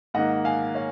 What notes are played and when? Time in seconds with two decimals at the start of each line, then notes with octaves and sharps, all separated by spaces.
0.14 G#2 D#3 A#3 D#5 F#5
0.45 F5 G#5
0.75 C#5 F5